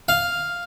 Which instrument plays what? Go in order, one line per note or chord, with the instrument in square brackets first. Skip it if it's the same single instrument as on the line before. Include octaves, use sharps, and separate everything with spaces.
[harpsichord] F5